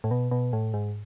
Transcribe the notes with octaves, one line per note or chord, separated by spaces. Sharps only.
A2
B2
B2
A2
G#2